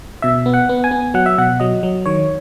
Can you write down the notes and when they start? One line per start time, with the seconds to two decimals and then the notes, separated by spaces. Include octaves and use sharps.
0.22 B2 E5
0.46 B3
0.54 F#5
0.69 B3
0.84 G#5
0.91 B3
1.14 F#3 F#5
1.26 E5
1.38 B2 F#5
1.60 F#3 D#5
1.83 F#3
2.06 D#3 C#5